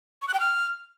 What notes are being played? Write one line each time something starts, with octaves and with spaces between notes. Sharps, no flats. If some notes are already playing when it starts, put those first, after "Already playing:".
C#6
F#6
G5
F6